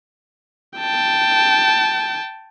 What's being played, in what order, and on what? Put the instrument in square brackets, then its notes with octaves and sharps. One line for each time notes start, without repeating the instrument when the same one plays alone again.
[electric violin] G5 A5